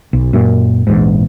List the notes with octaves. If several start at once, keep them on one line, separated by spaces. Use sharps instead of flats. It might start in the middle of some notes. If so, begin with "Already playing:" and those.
B1
F#2 A#2
A#1 E2 G#2